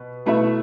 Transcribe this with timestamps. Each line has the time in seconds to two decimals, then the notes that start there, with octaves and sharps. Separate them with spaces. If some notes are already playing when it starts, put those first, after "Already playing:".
Already playing: B2 B4
0.26 B2 A3 E4 B4 E5